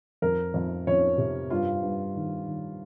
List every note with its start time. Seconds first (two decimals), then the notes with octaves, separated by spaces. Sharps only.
0.22 F2 A#4
0.54 F2
0.87 F2 C#4 C#5
1.18 C3
1.50 G2 F4 F5
1.82 G2
2.15 D#3
2.46 D#3